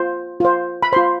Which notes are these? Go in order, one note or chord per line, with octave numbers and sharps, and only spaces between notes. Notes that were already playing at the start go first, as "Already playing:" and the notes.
Already playing: F4 C5
F4 C5
B5
F4 C5 C6